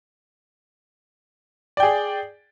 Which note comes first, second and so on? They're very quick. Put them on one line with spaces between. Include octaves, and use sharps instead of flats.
D5 G5 G#4